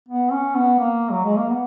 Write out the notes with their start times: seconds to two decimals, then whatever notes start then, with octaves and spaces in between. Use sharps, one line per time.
0.09 B3
0.32 C#4
0.55 B3
0.79 A#3
1.11 F#3
1.24 G#3
1.37 A#3
1.50 B3